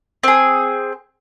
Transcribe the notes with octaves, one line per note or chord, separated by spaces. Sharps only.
C4 G#4